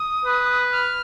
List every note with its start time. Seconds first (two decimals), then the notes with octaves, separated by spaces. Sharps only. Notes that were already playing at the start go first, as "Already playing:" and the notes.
Already playing: D#6
0.25 B4
0.72 F6